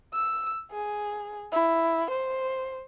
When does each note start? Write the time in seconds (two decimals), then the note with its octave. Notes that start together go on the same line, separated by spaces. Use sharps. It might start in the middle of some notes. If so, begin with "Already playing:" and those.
0.14 E6
0.71 G#4
1.52 E4
2.10 C5